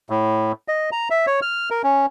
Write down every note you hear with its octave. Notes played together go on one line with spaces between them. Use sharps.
A2
D#5
A#5
E5
C#5
F6
A#4
C#4